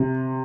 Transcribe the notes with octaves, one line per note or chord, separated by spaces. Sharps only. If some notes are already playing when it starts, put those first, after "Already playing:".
Already playing: C3